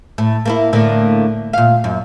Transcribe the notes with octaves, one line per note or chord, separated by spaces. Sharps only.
A2
A#3 C4 E4
A2 D3 A#3
A#2 F5
F#2